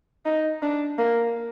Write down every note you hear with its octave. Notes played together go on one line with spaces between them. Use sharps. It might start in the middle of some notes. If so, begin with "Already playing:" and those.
D#4
D4
A#3